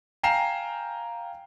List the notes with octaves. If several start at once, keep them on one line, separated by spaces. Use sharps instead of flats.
F5 G5 G#5 A#5 C7 E7